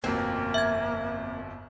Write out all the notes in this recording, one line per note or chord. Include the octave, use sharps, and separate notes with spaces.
G1 F2 B2 A#3 C4
E5 G#6